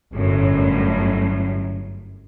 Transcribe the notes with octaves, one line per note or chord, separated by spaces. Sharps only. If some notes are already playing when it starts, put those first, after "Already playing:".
G1 F#2 A2